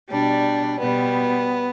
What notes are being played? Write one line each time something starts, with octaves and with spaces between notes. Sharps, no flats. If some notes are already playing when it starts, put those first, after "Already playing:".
B2 G3 D4
B2 G3 B3